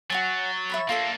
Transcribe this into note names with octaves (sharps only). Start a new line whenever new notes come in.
F#3 F#4 C#5 G#5 A6
E5 B5 C#6
A#3 D4 F4 A4 E5